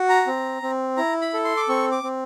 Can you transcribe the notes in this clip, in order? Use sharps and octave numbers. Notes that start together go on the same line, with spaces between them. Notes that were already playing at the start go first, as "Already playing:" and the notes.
Already playing: F#4
A#5
C4
C4
E4 A#5
B5
A4
C6
D6
C4 C#6
D6
C4